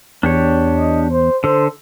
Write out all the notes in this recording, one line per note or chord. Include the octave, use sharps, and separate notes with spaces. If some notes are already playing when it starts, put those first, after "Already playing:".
E2 D4 G4 C#5
D#5
C5
D3 A4 C5